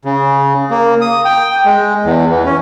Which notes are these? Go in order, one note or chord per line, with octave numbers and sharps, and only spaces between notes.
C#3
A#3
D#6
G5
G#3
E2
E3
C#4